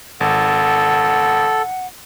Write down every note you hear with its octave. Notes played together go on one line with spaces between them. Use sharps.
G#1 A4 F#5